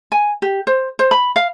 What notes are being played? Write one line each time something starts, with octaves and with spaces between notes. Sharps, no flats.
G#5
G4
C5
C5
B5
F5